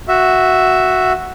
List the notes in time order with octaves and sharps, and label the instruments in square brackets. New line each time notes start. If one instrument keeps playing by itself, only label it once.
[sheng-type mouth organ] F#4 E5